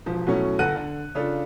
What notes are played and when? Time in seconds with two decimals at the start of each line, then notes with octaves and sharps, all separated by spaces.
0.06 E1 F3
0.27 B2 F#3 A3 C#4 E4
0.59 G1 A4 F#5 F#6 D#7
0.76 D3
1.15 C#3 D4 F4 A4